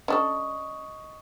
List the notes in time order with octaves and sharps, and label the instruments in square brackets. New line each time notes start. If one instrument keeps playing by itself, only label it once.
[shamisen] C#4 D4 A4 [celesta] D#5 C#6 D#6